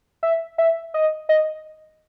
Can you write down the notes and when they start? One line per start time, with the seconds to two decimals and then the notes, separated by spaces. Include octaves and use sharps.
0.23 E5
0.58 E5
0.94 D#5
1.29 D#5